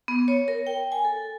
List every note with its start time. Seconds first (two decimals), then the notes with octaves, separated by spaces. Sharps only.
0.08 B3
0.28 C#5
0.48 A#4
0.67 G5
0.92 G#5
1.05 A4